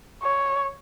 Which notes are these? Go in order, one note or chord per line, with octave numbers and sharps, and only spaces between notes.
C#5